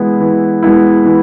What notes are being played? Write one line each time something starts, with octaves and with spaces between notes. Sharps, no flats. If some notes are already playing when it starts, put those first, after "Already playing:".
Already playing: E3 G#3 B3 E4
E3
G#3 B3 E4
E3